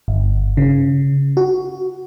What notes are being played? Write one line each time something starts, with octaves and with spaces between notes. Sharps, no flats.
G1
C#3
F#4